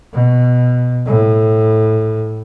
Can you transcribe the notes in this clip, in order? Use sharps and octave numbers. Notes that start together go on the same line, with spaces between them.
B2
A2